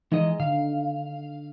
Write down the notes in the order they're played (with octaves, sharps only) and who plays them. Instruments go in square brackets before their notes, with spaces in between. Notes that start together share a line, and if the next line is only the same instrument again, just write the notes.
[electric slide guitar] E3 G#3 D#5 [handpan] D#4
[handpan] D3 [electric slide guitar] F5